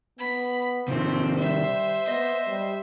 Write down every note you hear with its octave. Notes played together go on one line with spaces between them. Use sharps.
B3 B5
C3 D#3 F3 C4
G3 C5 E5
B3 D#5
G3